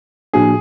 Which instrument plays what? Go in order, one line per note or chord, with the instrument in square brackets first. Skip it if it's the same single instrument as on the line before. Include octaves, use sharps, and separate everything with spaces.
[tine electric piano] A2 F3 A#3 D4 F#4 [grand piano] G#4